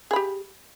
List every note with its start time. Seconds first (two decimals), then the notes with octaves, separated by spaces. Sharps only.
0.11 G#4
0.13 B5
0.16 G4